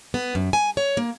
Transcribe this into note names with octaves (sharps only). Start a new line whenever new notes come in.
B3
F#2
G#5
C#5
A#3